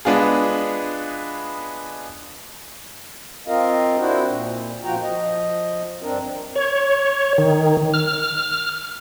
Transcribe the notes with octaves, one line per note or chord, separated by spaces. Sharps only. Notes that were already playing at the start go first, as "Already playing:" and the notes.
G#3 B3 D4 F4 G#4
C4 F4 A#4 D#5 F5
C4 D4 E4 F#4 C5
A#2
A#2 F3 F4 F#4 G5 A#5
F3 D#5
G2 C4 D4 A#4
C#5
D#3
F6